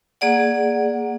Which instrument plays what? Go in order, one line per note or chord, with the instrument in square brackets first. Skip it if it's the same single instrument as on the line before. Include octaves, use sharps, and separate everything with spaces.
[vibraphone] A#3 G#4 D5 F#5